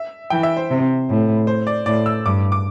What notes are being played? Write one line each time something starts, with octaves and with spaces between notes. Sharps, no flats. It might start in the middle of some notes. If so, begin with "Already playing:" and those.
Already playing: E5
E3 G5
E5
C5
C3
A2
C5
D5
A2 D5
E6
G2 D6
D6